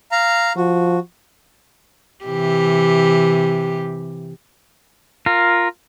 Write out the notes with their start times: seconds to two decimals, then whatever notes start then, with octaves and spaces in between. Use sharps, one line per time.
0.12 F5 A#5
0.56 F3 F#4
2.24 C3 E3 G4
5.26 F4 A#4